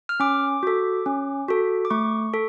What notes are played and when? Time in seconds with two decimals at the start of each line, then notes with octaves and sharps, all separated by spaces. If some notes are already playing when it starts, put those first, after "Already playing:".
0.09 F6
0.20 C#4 D6
0.63 F#4 A4
1.06 C#4
1.48 F#4 A4
1.85 D6
1.90 A3 C#6
2.34 A4